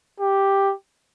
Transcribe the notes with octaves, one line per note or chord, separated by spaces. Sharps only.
G4